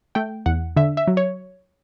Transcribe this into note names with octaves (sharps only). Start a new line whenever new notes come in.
A3 G5
E2 F#5
D3 E5
E5
F#3
C#5